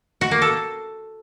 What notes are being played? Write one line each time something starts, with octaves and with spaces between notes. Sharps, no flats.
F#4
A#3
A4